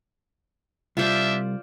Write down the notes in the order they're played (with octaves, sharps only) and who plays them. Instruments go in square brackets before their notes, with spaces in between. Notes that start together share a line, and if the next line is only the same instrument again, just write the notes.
[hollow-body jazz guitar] C2 [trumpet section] D4 E5 [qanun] F4 C5 D5